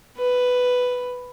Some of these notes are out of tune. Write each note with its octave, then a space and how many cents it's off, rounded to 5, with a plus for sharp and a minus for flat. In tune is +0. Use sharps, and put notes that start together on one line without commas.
B4 +5